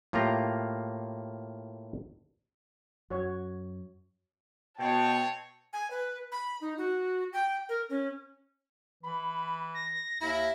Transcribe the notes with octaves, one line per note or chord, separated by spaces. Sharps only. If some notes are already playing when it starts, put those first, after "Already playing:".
A2 A#3 F4 G4 A#5
F#2 F#4 C#5
B2 C4 C#5 G5 A5
G#5
B4
B5
D#4
F#4
G5
A#4
C#4
E3 B5
A#6
D#2 E4